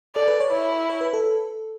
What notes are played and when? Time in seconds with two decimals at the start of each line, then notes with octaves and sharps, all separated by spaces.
0.16 A4 D5
0.28 B4
0.40 C#5
0.52 E4 C#5
0.90 C#5
1.01 B4
1.13 A4